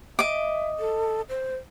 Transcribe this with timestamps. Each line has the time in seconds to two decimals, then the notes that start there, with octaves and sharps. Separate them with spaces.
0.19 D#5 E5 D6
0.80 A4
1.29 C5